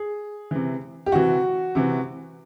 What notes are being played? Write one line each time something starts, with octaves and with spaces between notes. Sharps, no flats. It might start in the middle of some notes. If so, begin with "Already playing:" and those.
Already playing: G#4
C3 E3
G4
C3 E3 F#4
C3 E3